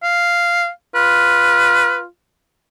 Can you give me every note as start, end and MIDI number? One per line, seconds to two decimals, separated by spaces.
0.03 0.69 77
0.95 2.06 65
0.95 2.01 71